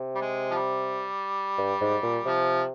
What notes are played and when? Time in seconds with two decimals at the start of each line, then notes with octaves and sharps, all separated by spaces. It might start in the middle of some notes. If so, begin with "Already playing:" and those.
Already playing: C3
0.15 G3
0.21 G#3
0.51 F3
0.56 G3
1.58 G2
1.81 G#2
2.03 A#2
2.25 C3 F3